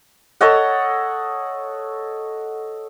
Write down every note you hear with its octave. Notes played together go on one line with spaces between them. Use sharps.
A4 C#5 D#5 F#5